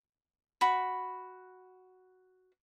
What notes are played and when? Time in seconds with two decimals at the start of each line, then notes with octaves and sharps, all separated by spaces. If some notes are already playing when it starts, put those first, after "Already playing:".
0.61 F#4 B5